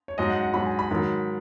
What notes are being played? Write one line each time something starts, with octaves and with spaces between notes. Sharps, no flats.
C#5
G#2 F#3 D#5
F#5
F#5
G#2 F#3 B5
G#5
B5
G#2 D#3 F#3